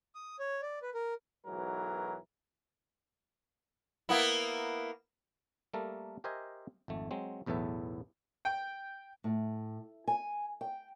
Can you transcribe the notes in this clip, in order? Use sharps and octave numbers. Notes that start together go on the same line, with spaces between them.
D#6
C#5
D5
B4
A#4
B1 G#2 E3 F#3 A#4
A#3 B3 E4
G3 A3 A#3 A4 A#4
G4 A#4 C5 D#5 E5 G#5
G#1 F2 A3
F#3 G#3 C4
B1 E2 A2 B3 A4 E5
G5
A2
G#5
G5